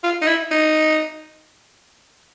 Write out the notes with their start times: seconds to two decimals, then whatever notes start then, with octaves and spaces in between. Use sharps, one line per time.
0.03 F4
0.22 D#4
0.27 E4
0.51 D#4